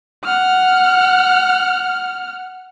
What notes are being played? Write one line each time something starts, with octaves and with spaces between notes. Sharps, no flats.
F#5 F6